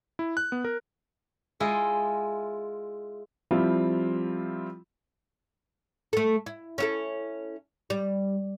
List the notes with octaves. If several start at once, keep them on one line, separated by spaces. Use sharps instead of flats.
E4
F#6
B3
A#4
G#3 E4 F4 D#5
F3 G3 C4 E4 F4
A3 A4
E4
C#4 E4 A4
G3